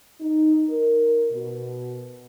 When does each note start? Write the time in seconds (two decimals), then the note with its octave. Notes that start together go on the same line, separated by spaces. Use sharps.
0.21 D#4
0.69 A#4
1.31 B2